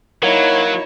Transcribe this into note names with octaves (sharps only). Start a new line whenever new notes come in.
F#3 A#3 D#4 E4 C#5